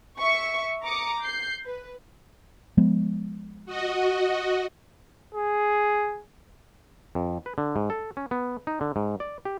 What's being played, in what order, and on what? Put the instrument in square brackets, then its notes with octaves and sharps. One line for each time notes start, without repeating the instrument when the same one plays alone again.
[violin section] E5 C#6
A#5 D6 D#6 C#7
G6 C7
B4
[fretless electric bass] F3 G#3 B3
[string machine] F#4 D#5
[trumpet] G#4
[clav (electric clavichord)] F2
B4
D3
G#2
A4
C#4
B3
D#4
D3
G#2
D5
G4